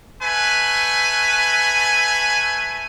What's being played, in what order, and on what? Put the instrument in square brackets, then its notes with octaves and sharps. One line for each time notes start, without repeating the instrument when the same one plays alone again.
[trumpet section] A3 B4 G#5